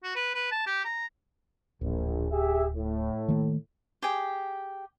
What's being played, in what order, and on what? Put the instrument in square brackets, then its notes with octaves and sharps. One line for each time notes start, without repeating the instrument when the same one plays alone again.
[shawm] F#4
B4
B4
A5
G4
A#5
[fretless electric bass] D1 [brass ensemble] A#1
[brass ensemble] G4 G#4 E5
A2
[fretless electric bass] D#3 A3 A#3
[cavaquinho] G4 G#4 G5